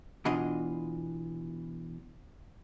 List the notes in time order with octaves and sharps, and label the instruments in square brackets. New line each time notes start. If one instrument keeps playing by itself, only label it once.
[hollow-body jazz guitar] B2 E3 D4 F4 D#5